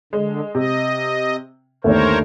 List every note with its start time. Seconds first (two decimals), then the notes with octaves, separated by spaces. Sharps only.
0.13 D3 G#3
0.55 C3 D#5
1.84 G1 D#2 A3 D4 A#4 C5 C#5